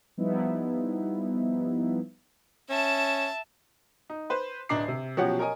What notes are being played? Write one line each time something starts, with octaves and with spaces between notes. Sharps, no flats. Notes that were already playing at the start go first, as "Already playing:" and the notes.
F3 G3 B3 D#4 E4
C#4 E5 A5
D#4
B4 C5
D1 D4 D#5 A#5 D6 C7
C3
B2 F3 F#3 C#4 G4 F#5
A#4 C#5 D#5 G#5